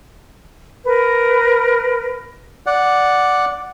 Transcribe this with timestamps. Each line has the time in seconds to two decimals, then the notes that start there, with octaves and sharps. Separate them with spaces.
0.85 A#4 B4
2.66 D5 F#5